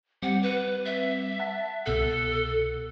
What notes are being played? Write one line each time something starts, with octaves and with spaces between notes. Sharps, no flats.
G3 C4 F#5
B4
E5
F#5 A5
C2 B2 A4 F#6